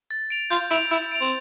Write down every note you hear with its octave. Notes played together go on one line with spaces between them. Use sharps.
A6
D7 F7
F4 G6
E4 D7 F7
E4 G6
D7 F7
C4